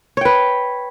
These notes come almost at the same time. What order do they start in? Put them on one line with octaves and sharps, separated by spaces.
C#5 G5 B4